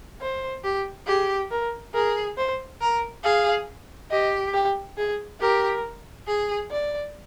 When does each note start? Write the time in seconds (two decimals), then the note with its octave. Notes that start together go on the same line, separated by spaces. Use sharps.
0.21 C5
0.64 G4
1.07 G4 G#4
1.51 A#4
1.94 G#4 A#4
2.37 C5
2.81 A#4
3.23 G#4 F5
4.11 G4 D#5
4.54 G4
4.98 G#4
5.40 G4 A#4
6.27 G#4
6.71 D5